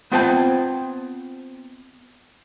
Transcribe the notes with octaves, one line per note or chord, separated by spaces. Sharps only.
B3 C4 F4 C5 G5 A5